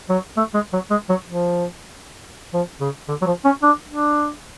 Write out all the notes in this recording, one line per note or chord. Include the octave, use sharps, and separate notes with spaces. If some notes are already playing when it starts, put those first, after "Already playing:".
F#3
A3
G#3
F#3
G#3
F#3
F3
F3
C#3
D3
F#3
F3
C#4
D4
D4